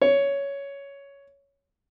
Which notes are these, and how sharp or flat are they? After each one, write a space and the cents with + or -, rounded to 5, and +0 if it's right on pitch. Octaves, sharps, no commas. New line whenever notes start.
C#5 +10